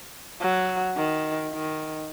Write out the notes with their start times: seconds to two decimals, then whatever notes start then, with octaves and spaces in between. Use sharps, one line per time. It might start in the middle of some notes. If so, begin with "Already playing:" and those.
0.41 F#3
0.97 D#3
1.54 D#3